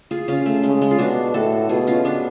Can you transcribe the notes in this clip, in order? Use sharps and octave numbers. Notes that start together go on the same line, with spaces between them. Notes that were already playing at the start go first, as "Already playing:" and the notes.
F4 G#4
C#3 C#4 F4
A3
C#3 G#3
G#3
F4
B2 D4 F#4
A2 F#4 A4
B2 F4 G#4
C#4 F4
B3 D4